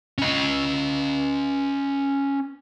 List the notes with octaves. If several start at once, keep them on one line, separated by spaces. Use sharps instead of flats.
C#4 D#5